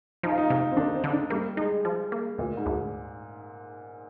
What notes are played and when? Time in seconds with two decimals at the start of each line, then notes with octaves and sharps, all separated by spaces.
0.23 F3 D#4
0.31 F4
0.38 D#4
0.50 C3 D#4
0.72 C4
0.77 D#2 D4
0.95 C4
1.04 D3
1.13 D4
1.30 G3 A#3
1.57 G#3 D#4
1.85 F3
2.12 A#3
2.38 D2 A#2
2.57 G#2
2.66 D2